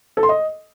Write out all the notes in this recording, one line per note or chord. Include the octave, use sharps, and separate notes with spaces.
A4
C6
D#5